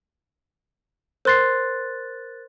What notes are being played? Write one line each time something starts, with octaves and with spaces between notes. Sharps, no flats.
A#4 C5 C6 F#6 A6 C7